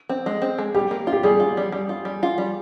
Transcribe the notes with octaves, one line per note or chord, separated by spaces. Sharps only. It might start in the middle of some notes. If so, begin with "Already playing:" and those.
C4
G#3
C4
G#3
G3 G4
A#3
F4
G4
G3 G#4
F4
G3
G3
F4
G3
F4
G3